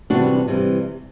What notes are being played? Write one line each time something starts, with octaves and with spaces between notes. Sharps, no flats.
C3 E3 G3 D4 F#4
C3 E3 G3